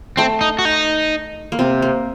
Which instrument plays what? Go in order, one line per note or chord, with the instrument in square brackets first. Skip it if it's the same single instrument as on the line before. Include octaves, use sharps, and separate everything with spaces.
[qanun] A3 [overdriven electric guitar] C4
[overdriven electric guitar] D#4
F#4
D#4
[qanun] A#3
C3 C4
A#3